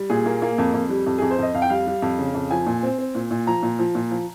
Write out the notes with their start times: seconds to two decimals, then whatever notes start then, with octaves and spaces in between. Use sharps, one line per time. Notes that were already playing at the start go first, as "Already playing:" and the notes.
Already playing: G3
0.10 A#2 G#4
0.26 A#3
0.42 A#3
0.58 F2
0.74 F2
0.90 G3
1.06 F2
1.18 F2 G#4
1.31 C5
1.38 F2 D#5
1.54 F2 F5
1.62 G5
1.70 G3 F5
1.87 G3
2.02 F2
2.18 C#3
2.34 F2
2.51 F3 G#5
2.66 A#2
2.83 C4
2.98 C4
3.15 A#2
3.31 A#2
3.47 F3 A#5
3.63 A#2
3.79 F3
3.95 A#2
4.11 F3